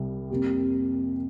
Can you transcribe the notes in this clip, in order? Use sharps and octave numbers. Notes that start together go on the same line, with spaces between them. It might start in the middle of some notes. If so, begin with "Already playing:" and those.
Already playing: C2 C3 G3
F2 C3 A#3 G4